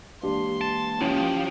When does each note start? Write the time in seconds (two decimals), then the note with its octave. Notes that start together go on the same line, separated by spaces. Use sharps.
0.23 E3 G#3 A#3 D4 G4 C6
0.61 A5
1.01 D#2 F3 C#4 E4 G4